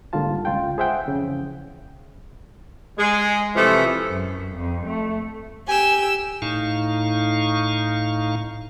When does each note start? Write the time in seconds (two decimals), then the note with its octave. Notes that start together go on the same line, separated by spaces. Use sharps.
0.13 G#2 D3 G3 A#3 F4 A5
0.45 C#2 F4 F5 G5
0.78 G#4 C5 E5 F#5 G5
1.06 F2 C#3 E3
2.98 G#3
3.56 C3 E3 F3 A3
4.07 F#2
4.56 F2
4.87 A3
5.69 G4 G#5 E6
6.42 A2 D#4 F5 C#6